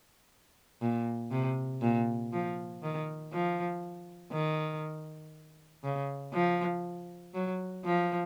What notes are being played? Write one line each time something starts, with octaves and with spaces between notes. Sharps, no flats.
A#2
C3
A#2
F3
D#3
F3
D#3
C#3
F3
F#3
F3